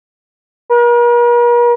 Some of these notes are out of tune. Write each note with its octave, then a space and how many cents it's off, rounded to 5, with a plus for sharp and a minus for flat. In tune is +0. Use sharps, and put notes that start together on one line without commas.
A#4 +45